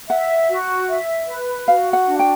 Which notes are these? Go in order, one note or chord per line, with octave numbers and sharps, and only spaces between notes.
E5 F#5
F#4
E5
B4
F#4 F5
F#5
D4
G5